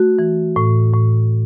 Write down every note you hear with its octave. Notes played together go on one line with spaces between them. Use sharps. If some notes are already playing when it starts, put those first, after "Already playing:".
Already playing: A3 F#4
E3
A2
A2